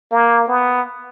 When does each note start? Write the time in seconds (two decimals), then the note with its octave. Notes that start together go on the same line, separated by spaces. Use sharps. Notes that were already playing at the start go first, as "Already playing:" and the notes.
0.12 A#3
0.48 B3